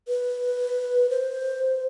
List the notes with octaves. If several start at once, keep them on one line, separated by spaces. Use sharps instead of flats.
B4
C5